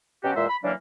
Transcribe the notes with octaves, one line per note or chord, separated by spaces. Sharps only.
B2 F#3 C#4 F#4 G4
E2 A#2 G#3 C5 E5
B5
C#3 E3 F#3 G3 A#3 D4